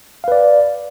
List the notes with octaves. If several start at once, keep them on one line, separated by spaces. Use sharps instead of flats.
B4 D5 F5